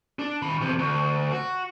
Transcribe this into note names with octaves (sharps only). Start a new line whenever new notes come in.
D4
D#3 B5
E2 C3
D2
F#4